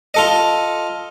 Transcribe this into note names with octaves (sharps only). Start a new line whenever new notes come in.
F4 A4 D#5